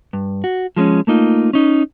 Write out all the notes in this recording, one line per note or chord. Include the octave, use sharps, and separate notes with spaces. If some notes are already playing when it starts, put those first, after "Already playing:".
G2
F#4
F3 G#3 C4 C#4
A3 A#3 D#4 F4
C#4 D#4